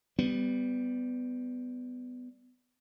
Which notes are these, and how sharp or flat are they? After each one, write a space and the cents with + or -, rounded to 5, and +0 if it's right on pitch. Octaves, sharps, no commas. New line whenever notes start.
G3 +0 B3 +20